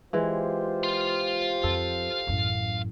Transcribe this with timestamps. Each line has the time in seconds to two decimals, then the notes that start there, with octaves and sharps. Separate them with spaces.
0.13 E3 G#3 F4 G4 C5
0.84 F5 C6
1.63 F2 A4
2.27 A1 F#2